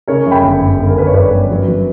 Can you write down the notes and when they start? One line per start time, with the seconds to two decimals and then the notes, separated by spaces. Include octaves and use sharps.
0.08 C#3 A#4 C#5
0.26 F#2
0.31 G5 B5
0.43 G1
0.61 G1
0.79 G1
0.89 A#4
0.97 G1 B4
1.07 C#5
1.14 G1 B4 D5
1.33 F#2
1.51 F#3
1.68 F#3